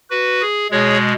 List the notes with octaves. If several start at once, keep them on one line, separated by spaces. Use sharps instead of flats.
F#4 B4
G#4
B2 G#3 G#4 C#5